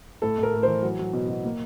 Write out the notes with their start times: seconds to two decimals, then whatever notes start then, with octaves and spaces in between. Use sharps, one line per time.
0.22 A2 A4
0.38 A2
0.43 A#4
0.53 A2
0.63 E3 C5
0.83 F#3
0.99 F#3
1.13 B2
1.29 B2
1.44 A#3